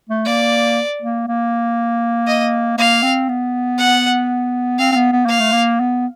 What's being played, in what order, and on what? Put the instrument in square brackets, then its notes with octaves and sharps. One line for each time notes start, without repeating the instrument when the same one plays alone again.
[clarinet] A3
[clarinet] A#3 [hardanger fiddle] D5
[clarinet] A#3
A#3
[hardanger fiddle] D#5
[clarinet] A#3 [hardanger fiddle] F5
[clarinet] C4
B3
[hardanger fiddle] F#5
[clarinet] C4 [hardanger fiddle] F5
[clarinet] C4
B3
B3
[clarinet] A#3 [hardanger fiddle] F5
[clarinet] A3
A#3
B3